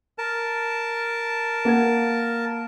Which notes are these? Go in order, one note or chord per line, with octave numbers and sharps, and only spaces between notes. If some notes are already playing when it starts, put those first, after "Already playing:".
A#4 A5
A#3 F#5 G#6